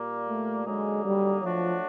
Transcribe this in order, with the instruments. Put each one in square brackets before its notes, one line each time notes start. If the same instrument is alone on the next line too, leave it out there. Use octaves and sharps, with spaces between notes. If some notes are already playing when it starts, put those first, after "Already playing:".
Already playing: [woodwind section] A#2 G3 A#3
[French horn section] A3
[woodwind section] D3 F#3 A#3 D#4 [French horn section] G#3
[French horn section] G3
[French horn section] F3 [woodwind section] F#3 A3 D4 F#4